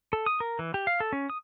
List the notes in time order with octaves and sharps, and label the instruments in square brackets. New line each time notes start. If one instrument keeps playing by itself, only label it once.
[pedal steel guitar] A4
D#6
A#4
E3
G4
F5
A4
C#4
D#6